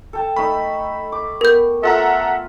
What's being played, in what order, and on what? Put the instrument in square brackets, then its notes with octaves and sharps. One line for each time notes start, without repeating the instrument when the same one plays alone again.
[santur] A4 G5 A5
[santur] A3 D#4 D#5 [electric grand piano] B5
[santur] D6
[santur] B3 [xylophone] A#4 G6
[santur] F4 [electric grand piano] A4 F#5 A#5 [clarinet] E5